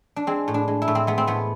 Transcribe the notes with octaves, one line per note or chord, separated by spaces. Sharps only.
D4
G#3 C4
A2
D4
G#3
E4
A2
C4
G#3 B3
C4
A2 B3